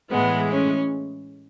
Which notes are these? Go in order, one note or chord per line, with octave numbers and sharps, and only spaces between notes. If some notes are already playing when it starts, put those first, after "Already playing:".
A2 E3 G#3 B3
C#4